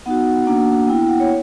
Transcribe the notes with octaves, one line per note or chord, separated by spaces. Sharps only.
B3 D#4 F#4 F#5
F#5
A#3 D4 F#4 F#5
B3 E4 G5
F#5
C#5